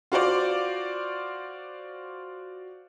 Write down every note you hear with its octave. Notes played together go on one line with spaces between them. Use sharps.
F4 F#4 C5 D5